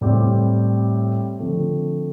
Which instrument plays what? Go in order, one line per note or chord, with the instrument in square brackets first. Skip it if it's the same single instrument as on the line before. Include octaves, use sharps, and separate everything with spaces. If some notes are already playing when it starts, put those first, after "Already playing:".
[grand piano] A2 G3 C4 G4
D3 F3 A3 C4